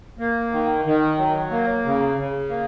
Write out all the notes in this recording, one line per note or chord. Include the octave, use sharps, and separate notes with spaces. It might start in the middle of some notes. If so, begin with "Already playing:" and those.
A#3
D#3
D#3
F#3
A#3
C#3
C#3
A#3